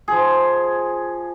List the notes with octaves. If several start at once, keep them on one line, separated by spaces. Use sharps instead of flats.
F3 G#4